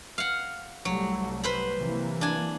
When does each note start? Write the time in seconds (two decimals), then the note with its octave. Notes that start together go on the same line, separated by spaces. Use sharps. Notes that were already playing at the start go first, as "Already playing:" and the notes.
0.18 F5 F#5
0.85 C2 F#3 G3 A3
1.43 B4 C5 B5
1.77 C3 E3 A#3
2.21 D4 G#5